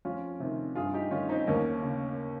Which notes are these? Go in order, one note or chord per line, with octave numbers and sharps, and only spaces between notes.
F2 C#4 F4
C3 D#3
G2 F4 G#4
D#4 G4
D#3 C#4 F4
C4 D#4
D#2 A#3 C#4
C#3